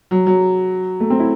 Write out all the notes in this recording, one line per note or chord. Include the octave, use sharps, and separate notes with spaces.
F#3
F#3
A3
C4
E4